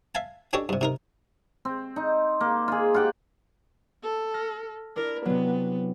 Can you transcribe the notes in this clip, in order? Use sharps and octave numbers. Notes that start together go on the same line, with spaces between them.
E5 F5 G#5 A5
C#4 D4 G4 A4 C#5 D#5
G2 C3
C3 D#4 A#4
C4
D#4
A#3
F4 G#4
F4 G4 F#5 G5
A4
F6 A#6
D4 E4 A#4
C3 F#3 B3